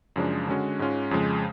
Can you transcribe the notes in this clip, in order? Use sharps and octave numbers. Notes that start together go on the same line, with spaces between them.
F#2 C#3 F3 G#3 D4
D3 G#3 C#4 F#4
G#2 G#3 C#4 F4
F2 C#3 F3 G#3